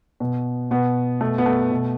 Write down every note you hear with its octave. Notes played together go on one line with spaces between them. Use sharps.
B2
B2 B3
B2 A3
B3
A3
B2